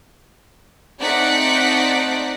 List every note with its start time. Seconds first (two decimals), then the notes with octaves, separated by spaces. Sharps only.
1.00 A3 C4 D#4 D5 F#5 B6